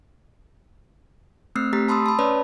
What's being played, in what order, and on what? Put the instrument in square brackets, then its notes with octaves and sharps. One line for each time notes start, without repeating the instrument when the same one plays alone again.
[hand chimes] A3 C4 E6 F6 C7
A3 G4 A#5 B6 C7
A5 B5 C6 D#6 E6
A5 B5
C#4 B4 C#5 D5 B5